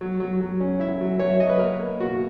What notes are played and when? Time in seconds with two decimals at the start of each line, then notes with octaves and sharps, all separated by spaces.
0.01 F#3
0.20 F#3
0.41 F#3
0.60 C#4
0.80 E4 E5
1.01 F#3
1.19 F#3 C#5
1.29 E5
1.40 F#3 D#5
1.49 B4
1.59 A#3 A#4
1.79 A#3
2.00 B2 F#4